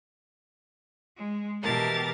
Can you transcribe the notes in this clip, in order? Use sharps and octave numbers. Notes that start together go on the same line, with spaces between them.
G#3
B2 E3 G4 A#4 A5 A6